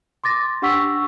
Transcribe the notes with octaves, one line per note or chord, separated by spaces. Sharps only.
C6 D6 A6 A#6
D4 G4 F#5 C#6 E6 B6